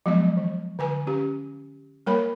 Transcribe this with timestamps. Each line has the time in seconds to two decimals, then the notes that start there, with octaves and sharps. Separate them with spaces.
0.06 F3 F#3 G#3 B3 D#5
0.37 E3
0.79 D3 B4 G#5
1.07 C#4 G4
2.06 G3 A#3 A#4 C#5 B5